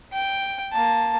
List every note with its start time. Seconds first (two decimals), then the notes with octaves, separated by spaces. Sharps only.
0.13 G5
0.72 A#3 A5